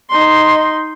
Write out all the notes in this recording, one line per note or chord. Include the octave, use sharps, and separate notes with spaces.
D#4 C6